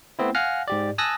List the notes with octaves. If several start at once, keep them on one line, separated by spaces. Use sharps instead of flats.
A3 B3 C4 E4
F5 F#5 G#5 F6 F#6 A#6
G#2 G4 D5
G#5 A5 D#6 E6 F#6 A#6